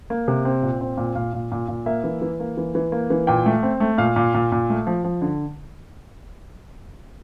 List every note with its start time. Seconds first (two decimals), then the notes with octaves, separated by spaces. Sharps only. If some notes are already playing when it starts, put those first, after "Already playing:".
0.10 A#3
0.28 C3
0.45 C4
0.62 A#2
0.81 C4
0.97 A#2
1.15 A#2 F5
1.33 A#2
1.52 A#2
1.68 A#2
1.86 A#3 E5
2.04 E3
2.22 E3
2.40 A#3
2.58 E3
2.75 E3
2.92 A#3
3.10 E3
3.27 A#2 G5
3.46 A3
3.63 C4
3.80 A3
3.98 A#2 F5
4.16 A#2
4.34 A#2
4.52 A#2
4.70 A3
4.87 F3
5.04 F3
5.22 D3